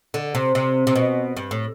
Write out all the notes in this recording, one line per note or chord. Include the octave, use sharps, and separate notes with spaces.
D3
C3
C3
C3
B2
G2
A2